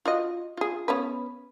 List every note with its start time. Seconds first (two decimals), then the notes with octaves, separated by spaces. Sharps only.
0.05 F4 F#4 D#5
0.57 F4 G#4
0.88 B3 C#4 B4